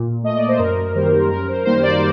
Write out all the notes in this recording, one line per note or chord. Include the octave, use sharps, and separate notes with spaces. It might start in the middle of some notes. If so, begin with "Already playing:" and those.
Already playing: A#2
A3 D#5
D5
C5
F#2 A#4
D#3 G3 A#3 C5
F#2 A#4
C5
D#3 G3 A#3 C5
D5